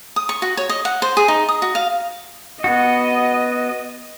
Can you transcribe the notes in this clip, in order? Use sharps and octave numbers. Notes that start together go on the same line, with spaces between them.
D#6
C#6
F#4
C#5
D#5
F#5
C5
G#4
D#4
D#6
F#4
F5
B3 F#4 D#5